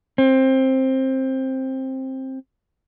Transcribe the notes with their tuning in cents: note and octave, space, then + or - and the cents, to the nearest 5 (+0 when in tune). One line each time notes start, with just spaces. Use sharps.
C4 +15